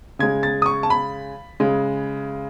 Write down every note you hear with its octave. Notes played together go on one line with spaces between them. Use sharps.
C#3 G#3 G#6
A6
D#6
C#6
A5
B5
C#3 G#3